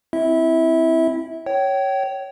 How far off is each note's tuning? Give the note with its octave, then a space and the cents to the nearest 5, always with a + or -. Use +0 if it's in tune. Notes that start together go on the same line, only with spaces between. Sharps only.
C4 +0 E4 +0 E5 -25
C#5 +0 G5 -30